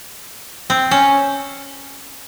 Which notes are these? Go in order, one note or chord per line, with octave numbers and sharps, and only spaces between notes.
C4
C#4